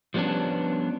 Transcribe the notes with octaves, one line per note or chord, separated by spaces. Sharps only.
F3 G3 B3 C#4 D4